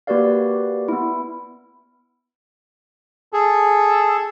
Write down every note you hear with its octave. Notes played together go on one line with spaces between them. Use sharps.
A#3 F#4 G4 B4 D5 F5
B3 E4
G#4 A4